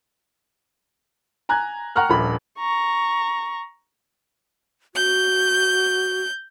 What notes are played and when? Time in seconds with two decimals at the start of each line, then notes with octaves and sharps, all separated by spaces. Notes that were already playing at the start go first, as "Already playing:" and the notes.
1.49 G#5 A#5 F#6 G#6
1.96 F#5 G5 A#5 C#6 F6 F#6
2.09 D#1 A#1 B5
2.59 A#5 C#6
4.95 F#4 G6